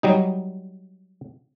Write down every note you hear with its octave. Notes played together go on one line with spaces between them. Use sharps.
F#3 G3 D#4